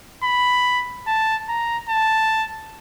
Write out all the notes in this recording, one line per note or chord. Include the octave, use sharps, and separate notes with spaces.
B5
A5
A#5
A5